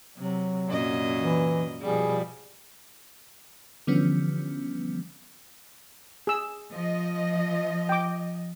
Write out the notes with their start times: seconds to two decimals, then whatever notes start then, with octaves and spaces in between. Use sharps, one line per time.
0.18 C3 F#3
0.68 F#2 A#2 D#5
1.19 E3
1.82 B2 F3 G3 G#4
3.87 D3 E3 F3 G3 B3 C#4
6.27 G#4 E6
6.71 F3 D#5
7.89 G5 D6